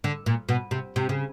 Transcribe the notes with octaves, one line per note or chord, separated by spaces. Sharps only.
D3
A#2
B2
C3
C3
C#3